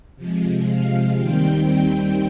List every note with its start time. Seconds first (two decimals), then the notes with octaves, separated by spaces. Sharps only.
0.16 C3 F3 G#3
0.68 F5
1.19 D#2 D#3 G3 C4 G5